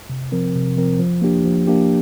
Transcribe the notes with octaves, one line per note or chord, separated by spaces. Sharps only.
C3
F3 C4 A#4
C3
F3 C4 A#4
F3
A#3 D4 G4
F3
A#3 D4 G4